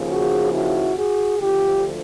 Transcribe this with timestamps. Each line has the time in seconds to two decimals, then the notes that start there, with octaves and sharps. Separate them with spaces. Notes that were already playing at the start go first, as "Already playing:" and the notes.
Already playing: D#2 C#3 F3
0.09 F#4 G#4
0.52 E4 F#4
0.96 F#4 G#4
1.39 D2 D3 F3 F4 G4